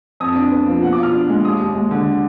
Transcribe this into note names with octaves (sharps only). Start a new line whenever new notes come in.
F2 D#6
D4
B3
F3
B2 F#5
D6
F4 F6
D4
G#3
D#2 D#6
D#2
G#3
D3